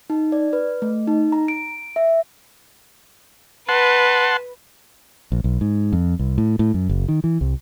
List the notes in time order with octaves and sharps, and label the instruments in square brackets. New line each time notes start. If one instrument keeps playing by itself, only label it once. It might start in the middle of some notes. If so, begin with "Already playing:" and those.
[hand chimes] D#4
D5
B4
A3
D#4
A#5
D7
E5
[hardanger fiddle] B4 [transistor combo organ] F#5 A5 C6
[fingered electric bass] A#1
B1
G#2
F2
C2
A2
A2
F#2
F#1
D#3
E3
C2